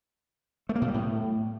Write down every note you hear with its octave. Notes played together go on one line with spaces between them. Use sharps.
A3
A#3
B2
G3
A2